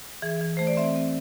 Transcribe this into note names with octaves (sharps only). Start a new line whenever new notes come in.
E3 G#4
E3
A3 C5
D5
C4 E5
C4